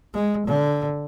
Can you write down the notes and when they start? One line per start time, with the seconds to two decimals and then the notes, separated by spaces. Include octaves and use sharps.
0.14 G#3
0.47 D3